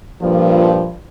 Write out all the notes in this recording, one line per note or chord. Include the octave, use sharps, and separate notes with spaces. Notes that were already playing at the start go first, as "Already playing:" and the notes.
G2 A#2 F3